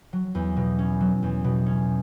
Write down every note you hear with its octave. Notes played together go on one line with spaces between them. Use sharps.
F#3
E2
B2
C#4
F#3
E2
B2
C#4